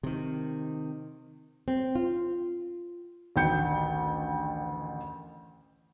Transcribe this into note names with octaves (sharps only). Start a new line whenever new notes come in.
C3 D#3
C4
F4
A1 D2 D#3 G5 G6 C#7